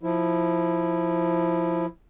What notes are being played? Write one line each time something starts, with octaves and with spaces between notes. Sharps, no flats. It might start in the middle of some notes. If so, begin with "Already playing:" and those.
F3 E4